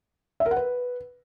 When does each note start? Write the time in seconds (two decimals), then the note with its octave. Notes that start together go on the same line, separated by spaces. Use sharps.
0.40 E5
0.46 A#4
0.51 F#5
0.57 B4